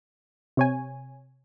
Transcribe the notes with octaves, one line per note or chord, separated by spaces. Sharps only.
C3 C#5 G#5